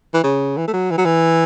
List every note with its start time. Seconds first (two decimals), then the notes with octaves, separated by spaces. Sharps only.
0.14 E3
0.23 C#3
0.57 E3
0.68 A3
0.73 F#3
0.91 E3
0.98 F#3
1.05 E3